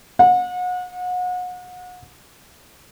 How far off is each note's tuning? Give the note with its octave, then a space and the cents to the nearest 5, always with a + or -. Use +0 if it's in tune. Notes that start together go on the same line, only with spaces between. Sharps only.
F#5 -35